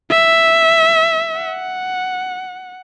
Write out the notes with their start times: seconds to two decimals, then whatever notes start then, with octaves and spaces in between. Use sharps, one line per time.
0.11 E5
1.39 F#5